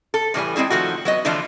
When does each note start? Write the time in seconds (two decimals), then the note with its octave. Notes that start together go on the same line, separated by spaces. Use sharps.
0.14 A4
0.34 A2 E3 G3 G#5
0.56 G3 G#3 C4 E4 G#4
0.70 D#3 F3 A3 F#4
1.05 F#3 B3 D#5
1.25 D3 E3 F3 A3 D4 F4